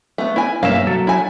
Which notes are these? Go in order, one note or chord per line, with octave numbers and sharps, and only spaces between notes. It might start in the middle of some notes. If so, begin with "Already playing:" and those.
A3 B3
E4 G#5
B1 G2 A#3 C#4 E5 F5
F#3 A4
E4 G#5